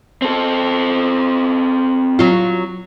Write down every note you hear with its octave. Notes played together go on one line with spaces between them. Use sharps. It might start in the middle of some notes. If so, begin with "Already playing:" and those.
C4 A4
F#3 F4